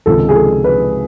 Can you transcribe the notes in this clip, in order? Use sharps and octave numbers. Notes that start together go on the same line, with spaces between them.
C#2 C3 D#3 A4
G#4
A4
B4